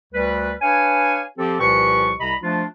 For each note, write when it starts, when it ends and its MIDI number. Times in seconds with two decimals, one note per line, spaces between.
0.13 0.52 38
0.13 0.52 55
0.13 0.52 71
0.62 1.22 62
0.62 1.22 71
0.62 1.22 73
0.62 1.22 77
0.62 1.22 80
1.38 1.56 53
1.38 1.56 60
1.38 1.56 67
1.38 1.56 69
1.60 2.12 36
1.60 2.12 46
1.60 2.12 53
1.60 2.12 67
1.60 2.12 71
1.60 2.12 85
2.20 2.34 36
2.20 2.34 48
2.20 2.34 75
2.20 2.34 82
2.20 2.34 83
2.42 2.63 53
2.42 2.63 57
2.42 2.63 62
2.42 2.63 65